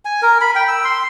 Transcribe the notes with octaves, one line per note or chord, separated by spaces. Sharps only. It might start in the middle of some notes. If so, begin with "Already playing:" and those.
G#5
A#4
B5
G5
E6
C6